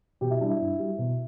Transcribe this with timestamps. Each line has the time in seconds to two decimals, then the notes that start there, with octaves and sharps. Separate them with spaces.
0.21 B2 G4
0.31 E4
0.40 G3 D4
0.50 E4
0.60 G2
0.79 G3
0.98 B2